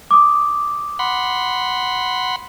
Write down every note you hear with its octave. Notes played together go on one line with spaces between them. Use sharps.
D6 D#6
F#5 B5 C6